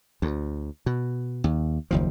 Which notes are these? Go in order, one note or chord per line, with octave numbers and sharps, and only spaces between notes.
D2
B2
D#2
F#1 D#2 F3